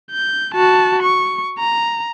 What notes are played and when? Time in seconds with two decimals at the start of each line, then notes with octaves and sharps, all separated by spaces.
0.11 G6
0.54 F#4 A5
1.03 C#6
1.59 A#5